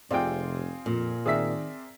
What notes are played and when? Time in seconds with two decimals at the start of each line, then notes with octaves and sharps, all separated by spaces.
0.11 F1 C3 C4 F4 G#4 D5 G5
0.86 F2 A#2
1.26 D#3 C4 G#4 A#4 D5 E5 B6